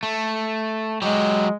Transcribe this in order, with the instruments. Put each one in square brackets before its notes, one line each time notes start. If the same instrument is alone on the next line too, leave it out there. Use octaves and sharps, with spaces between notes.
[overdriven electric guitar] A3
[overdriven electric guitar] F#3 G4 [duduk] G#3